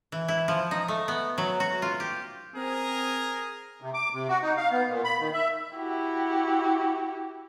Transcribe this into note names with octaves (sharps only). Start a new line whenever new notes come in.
E3
E4
F3
D#4
A3
B3
F#3
F#4
F4
G4
C4 G#4 A#4
C3
D6
C3
F#4
D#4
F5
B3
A#2
B5
D#3
E5
E4 F#4 G4